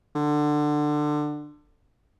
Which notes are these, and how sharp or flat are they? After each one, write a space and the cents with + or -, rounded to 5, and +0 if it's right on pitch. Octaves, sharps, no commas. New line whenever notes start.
D3 +20